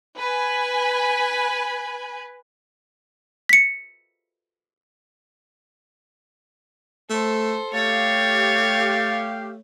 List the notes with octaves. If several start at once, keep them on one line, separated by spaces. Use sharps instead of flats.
B4 G#5
B6 C#7
A3 A4 C5
A3 G4 C#5 F5 A6